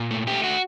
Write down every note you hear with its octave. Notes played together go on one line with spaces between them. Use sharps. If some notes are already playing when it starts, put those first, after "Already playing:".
Already playing: A#2
A3
A3 G4
F#4